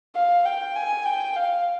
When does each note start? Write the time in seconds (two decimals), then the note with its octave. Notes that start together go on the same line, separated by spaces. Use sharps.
0.15 F5
0.45 G5
0.76 G#5
1.05 G5
1.36 F5